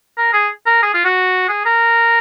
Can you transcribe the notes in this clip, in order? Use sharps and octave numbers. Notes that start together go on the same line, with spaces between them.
A#4
G#4
A#4
G#4
F4
F#4
G#4
A#4